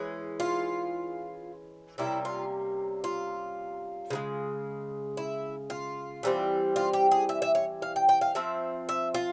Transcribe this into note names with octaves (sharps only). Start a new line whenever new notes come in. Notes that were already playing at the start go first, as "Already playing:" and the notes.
Already playing: E3 G#3 C#4
F4
C3 G3 A#3 C#4 E4
F4
F4
C#3 F3 G#3
E4
F4
E3 G3 C4
F4
G4
G#4
E5
E5
C#5
F5
G5
G5
F5
F3 C4 E5
E5
F4